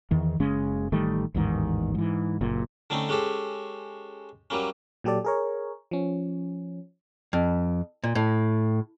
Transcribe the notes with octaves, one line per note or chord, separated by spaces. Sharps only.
E2 D#3 E3
F#1 C#3 G#3 C#4
A1 D#3 G3 A3
A1 E2 G#2 D#3
G#2 E3
F#1 A#2
D3 A3 C4 C#4 D#4
G#3 C#4 G4 A4 C5
F#3 G3 A#3 C#4
A#2 F#3 G4 A4 D5
G#4 A#4 C#5
F3 C#4
F2
A#2
A2